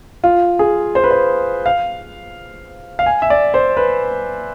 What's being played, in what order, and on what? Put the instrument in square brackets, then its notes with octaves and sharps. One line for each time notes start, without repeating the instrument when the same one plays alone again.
[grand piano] F4
G#4
C5
B4
C5
F5
F5
G#5
E5
D5
C5
B4